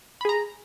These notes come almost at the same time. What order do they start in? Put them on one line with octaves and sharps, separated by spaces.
B5 G#4 A#5